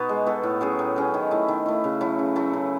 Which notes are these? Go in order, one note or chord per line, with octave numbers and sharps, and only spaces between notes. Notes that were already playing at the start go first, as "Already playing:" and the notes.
Already playing: B2 B3 D#4 F#4
G#3
B3 F#4 A4
A2
F#3 C#4 G#4
A2
F#3 C#4 G#4
D#3
A3 E4
D#3
A3 E4
C#3
F#3 A3 E4
C#3
F#3 A3 E4
C#3